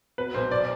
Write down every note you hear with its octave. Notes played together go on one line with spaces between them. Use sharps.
B2 B4
B1 C5
D5